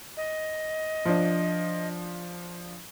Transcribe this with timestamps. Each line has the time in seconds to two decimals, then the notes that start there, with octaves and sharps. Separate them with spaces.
0.17 D#5
1.05 F3 D4